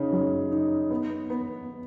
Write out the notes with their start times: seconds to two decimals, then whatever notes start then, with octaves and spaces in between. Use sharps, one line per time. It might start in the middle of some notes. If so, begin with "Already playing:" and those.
Already playing: C#3 D#4
0.12 F#2
0.51 D#4
0.90 B3
1.30 B3